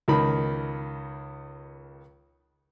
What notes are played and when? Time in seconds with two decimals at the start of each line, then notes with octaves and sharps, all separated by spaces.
0.08 C#2 D#3 B5